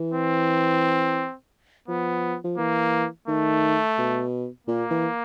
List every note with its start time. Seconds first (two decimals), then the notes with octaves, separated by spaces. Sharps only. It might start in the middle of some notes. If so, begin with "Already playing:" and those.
Already playing: E3
0.13 C4
1.88 F3 B3
2.44 F3
2.58 E3 A#3
3.28 D#3 A3
3.98 B2
4.67 A#2 A#3
4.90 E3